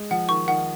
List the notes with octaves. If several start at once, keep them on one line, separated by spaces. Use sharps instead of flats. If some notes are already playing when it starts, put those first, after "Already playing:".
Already playing: G#3
F3 F#5
D#3 C#6
D#3 F#5